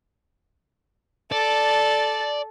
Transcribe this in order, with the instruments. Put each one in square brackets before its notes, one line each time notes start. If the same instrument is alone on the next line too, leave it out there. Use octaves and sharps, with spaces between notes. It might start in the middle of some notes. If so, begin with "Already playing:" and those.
[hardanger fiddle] A4 [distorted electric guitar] D5